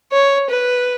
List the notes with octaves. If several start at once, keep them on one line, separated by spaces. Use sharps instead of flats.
C#5
B4